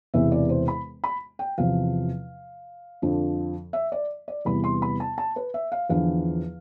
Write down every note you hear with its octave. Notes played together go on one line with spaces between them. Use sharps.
E1 E2 C3 E3 E5
D5
C5
B5
B5
G5
E2 C3 F3 F5
F2 D3 F3
E5
D5
D5
E2 C3 E3 G3 B3 B5
C6
B5
A5
A5
B4
E5
F5
E2 D3 F3 F5